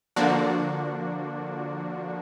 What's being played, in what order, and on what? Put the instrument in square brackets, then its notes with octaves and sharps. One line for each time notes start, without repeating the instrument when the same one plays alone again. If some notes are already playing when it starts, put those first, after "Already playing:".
[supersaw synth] D3 F3 A#3 D4 F#4